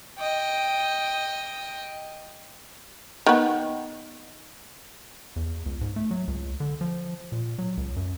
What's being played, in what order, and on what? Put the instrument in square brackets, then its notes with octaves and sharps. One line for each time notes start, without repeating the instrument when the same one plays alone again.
[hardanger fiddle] D#5 G5
[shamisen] D#3 B3
[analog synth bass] E2
C#2
G#2
A3
F#3
C#2
D3
F3
A#2
F#3
C#2
F#2